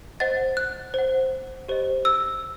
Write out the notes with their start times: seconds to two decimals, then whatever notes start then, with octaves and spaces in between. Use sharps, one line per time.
0.20 C5 D#5 F#5 A6
0.57 F#6
0.94 C5 F#5
1.68 G4 C5 D#5
2.05 E6